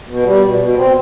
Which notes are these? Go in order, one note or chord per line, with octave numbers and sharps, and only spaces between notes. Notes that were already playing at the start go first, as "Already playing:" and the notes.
B2
G3
B2
B2
C4